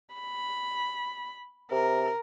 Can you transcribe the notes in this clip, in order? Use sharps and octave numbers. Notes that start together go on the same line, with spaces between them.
B5
C3 A#4